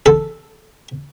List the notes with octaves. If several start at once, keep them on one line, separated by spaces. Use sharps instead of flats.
A4